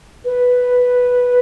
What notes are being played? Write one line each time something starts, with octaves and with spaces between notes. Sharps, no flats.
B4